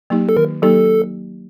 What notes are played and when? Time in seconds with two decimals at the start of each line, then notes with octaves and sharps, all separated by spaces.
0.10 F#3 A#3 D#4 G4
0.29 A4
0.36 D#3 A#4
0.62 F#3 A#3 D#4 G4 A4